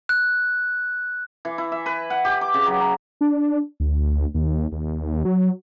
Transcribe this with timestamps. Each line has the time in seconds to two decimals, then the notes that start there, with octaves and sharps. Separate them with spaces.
0.09 F#6
1.45 E3
1.58 E4
1.72 E5
1.86 B4
2.10 F#5
2.25 G4
2.41 D6
2.54 C#3
2.66 F#3
2.80 A#5
3.21 D4
3.80 D2
4.34 D#2
4.72 D#2
5.25 F#3